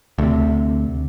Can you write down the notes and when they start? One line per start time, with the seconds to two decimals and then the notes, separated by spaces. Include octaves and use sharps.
0.18 D2 C3